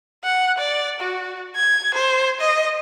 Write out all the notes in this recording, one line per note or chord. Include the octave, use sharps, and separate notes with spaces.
F#5
D5
F#4
G#6
C5
D#5